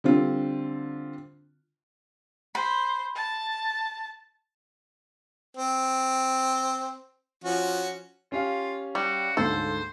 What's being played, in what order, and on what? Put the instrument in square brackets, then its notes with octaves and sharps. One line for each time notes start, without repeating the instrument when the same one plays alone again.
[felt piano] D3 G3 C4 F4
[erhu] C5 [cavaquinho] B5
[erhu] A5
[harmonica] C4
F3 C#4 F#4
[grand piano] C#4 G4 F5 [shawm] F4
[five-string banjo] G3 [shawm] F#4
[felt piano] D2 G#2 [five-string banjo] A4 [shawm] C5